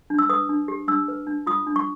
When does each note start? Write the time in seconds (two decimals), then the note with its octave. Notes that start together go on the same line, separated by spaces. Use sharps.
0.10 D4
0.19 E6
0.29 B4 D#6
0.49 D4
0.68 G4
0.88 D4 E6
1.08 B4
1.27 D4
1.46 F4 D#6
1.67 D4
1.76 C#6